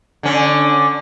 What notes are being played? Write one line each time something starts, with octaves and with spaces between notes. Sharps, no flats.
D3 C#4